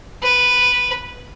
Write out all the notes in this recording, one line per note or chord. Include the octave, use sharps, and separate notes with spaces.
B4